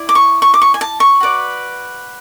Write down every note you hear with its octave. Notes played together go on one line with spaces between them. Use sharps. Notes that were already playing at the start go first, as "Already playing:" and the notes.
Already playing: E4 D5
D6
C#6
C#6
D6
C#6
G#5
A5
C#6
F#4 B4 D5